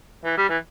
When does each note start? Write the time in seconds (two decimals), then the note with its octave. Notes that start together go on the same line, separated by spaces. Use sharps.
0.25 E3
0.37 G3
0.49 E3